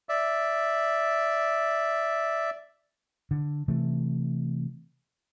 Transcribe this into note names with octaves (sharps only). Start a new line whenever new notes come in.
D5 E5
D3
C3 E3 A3